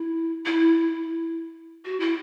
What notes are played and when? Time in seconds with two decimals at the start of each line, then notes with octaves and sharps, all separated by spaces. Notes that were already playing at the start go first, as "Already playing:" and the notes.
Already playing: E4
0.46 E4
1.85 F#4
2.00 E4